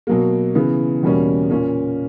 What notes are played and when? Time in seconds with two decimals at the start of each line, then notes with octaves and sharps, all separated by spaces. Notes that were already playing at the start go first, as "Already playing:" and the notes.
0.07 B2 F#3 A#3
0.55 C#3 E3 B3
1.03 E2 B2 G3 A#3 C#4
1.50 A#2 A#3 C#4